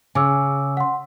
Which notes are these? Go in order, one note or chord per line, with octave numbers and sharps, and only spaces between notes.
C#3 G#5 D6 E6
F#5 C6